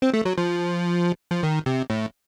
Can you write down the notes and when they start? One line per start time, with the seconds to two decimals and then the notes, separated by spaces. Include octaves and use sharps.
0.02 C4
0.14 A3
0.25 F#3
0.38 F3
1.31 F3
1.43 D#3
1.66 C3
1.90 A2